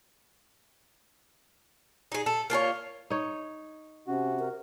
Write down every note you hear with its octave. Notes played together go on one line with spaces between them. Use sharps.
D#4 G#4
A4
A#3 F4 A4 C#5
D#4 C#5
C3 C#4 F#4
A#4